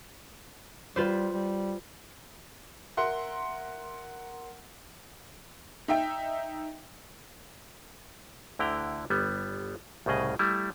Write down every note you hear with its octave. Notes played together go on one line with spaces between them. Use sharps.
G3 F4 B4 C5
G3
A#4 E5 F#5 C6
D#4 E5 G5
D2 D3 E4 G5 A#5
G1 G3 B3
C2 A2 C#3 G#4 D#5
G3 A3 E4